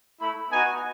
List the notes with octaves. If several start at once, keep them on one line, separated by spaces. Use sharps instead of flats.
A3 E4 B5
B3 D#4 F#4 G#5